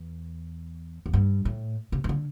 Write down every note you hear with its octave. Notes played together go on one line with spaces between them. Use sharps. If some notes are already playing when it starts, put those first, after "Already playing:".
Already playing: E2
E2
G2
A2
C3
E3
D3